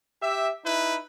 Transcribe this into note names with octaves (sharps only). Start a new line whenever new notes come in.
G4 E5
D#4 E4 B4